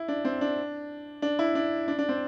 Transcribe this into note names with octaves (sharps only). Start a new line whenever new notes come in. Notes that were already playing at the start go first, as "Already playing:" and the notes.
Already playing: E4
D4
C4
D4
D4
E4
D4
D4
D4
C4